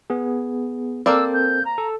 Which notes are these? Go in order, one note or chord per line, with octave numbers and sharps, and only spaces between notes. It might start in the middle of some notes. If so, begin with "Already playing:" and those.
B3 G#4
A#3 C4 A4 A#4 C5 D5 E6
G6
A#5
A4